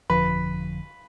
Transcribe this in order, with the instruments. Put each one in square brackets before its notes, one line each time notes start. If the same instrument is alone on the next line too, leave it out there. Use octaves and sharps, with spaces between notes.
[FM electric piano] G1 F2 D3 F3 [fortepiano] B4